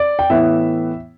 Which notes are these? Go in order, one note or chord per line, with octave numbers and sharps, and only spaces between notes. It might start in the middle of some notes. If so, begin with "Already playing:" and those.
Already playing: D5
G5
A2 E3 B3 E5